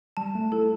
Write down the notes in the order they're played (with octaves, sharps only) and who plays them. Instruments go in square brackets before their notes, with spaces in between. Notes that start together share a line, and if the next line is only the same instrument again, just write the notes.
[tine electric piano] G3 [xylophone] A5
[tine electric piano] A3
[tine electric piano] E4 [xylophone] A4